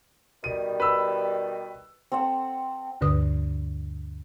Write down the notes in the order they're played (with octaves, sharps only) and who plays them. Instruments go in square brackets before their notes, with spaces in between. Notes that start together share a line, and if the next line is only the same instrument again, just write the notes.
[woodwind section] B2 D#3 G3 [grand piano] D#7
[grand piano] B4 E6
[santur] C4 A4 F#5
[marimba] D2 G2 D3 B4 D#6